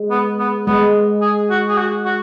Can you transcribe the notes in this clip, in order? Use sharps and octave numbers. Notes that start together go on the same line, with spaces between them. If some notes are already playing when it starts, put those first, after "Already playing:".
Already playing: G#3
B3
B3
G#3 B3
G#4
F#4
G#4
F#4
F#4